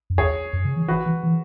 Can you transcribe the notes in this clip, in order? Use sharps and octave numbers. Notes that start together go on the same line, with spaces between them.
F#2
E2 G#4 C#5
F#2
C#3
E3
E3 F#4 B4
E3
E3